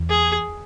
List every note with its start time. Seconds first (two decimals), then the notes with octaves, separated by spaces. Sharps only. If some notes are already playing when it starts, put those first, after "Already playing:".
Already playing: E2
0.10 G#4